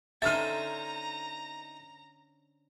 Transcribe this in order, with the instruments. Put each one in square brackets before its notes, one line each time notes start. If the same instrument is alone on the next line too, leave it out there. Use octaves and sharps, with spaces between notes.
[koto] D3 C#4 C5 [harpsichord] D#4 E5 [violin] A#5 [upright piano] F6 A6